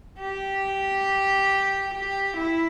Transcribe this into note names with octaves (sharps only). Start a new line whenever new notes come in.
G4
G4
E4